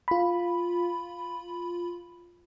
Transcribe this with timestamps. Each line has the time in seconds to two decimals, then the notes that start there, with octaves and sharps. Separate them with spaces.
0.08 F4 B5